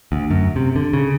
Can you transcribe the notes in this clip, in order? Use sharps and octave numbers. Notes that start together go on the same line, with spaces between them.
D2
F#2
C3
D3
C#3